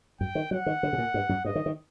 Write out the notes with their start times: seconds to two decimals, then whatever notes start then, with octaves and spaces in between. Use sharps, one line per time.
0.20 F#2 G5
0.35 D#3
0.51 F#3 F#5
0.66 D#3
0.83 D3
0.93 C3
0.98 A#2
1.14 G2
1.29 F#2
1.45 G2 D#5
1.55 D#3
1.66 D#3